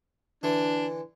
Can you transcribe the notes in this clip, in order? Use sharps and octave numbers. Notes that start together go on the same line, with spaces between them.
D3 E3 D4